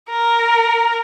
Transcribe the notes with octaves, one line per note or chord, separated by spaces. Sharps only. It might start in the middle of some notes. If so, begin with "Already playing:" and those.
A#4